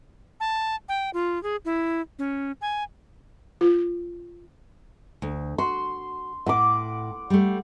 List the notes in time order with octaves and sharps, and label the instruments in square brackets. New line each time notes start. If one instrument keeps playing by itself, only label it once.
[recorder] A5
G5
F4
G#4
E4
C#4
G#5
[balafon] F4
[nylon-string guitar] D2
[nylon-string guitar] F#4 [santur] C6
[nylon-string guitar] A2 [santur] F#5 D6
[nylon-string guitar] G3 A3